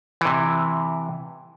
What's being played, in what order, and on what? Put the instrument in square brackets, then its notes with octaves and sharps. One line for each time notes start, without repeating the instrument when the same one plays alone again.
[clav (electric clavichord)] C3 E3